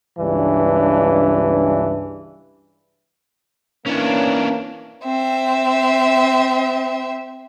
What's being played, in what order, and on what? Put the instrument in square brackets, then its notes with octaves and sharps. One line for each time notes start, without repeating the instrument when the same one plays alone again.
[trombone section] C#2 G2 E3 D4
[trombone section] E3 A#3 [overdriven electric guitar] C#4 D4
[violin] C4 E5